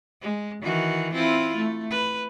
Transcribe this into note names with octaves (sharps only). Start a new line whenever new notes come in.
G#3
D#3 E3 F#4
C4 E4 F4
A3
B4